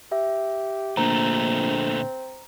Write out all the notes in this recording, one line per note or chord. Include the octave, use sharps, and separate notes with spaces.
G4 E5
A#1 A#2 D3 A3 C4 A#5